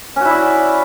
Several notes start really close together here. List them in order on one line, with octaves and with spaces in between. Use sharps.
C#4 F#4 E4 D5